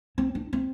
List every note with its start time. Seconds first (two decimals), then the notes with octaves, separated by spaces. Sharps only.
0.18 C4
0.35 D4
0.53 C4